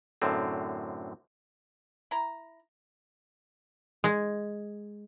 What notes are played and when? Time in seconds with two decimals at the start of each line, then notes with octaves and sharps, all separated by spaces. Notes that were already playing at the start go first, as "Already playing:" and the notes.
0.22 F#2 A2 D3 C4
2.11 E4 A#5
4.04 G#3